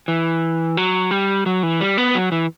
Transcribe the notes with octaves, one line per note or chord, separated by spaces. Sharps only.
E3
F#3
G3
F#3
E3
G3
B3
F#3
E3